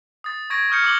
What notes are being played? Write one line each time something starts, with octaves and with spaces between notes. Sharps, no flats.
D#6 A6
C#6 G#6 A#6 D7
C#6 D#6 F6 G6 C#7
D6 E6 F#7 G7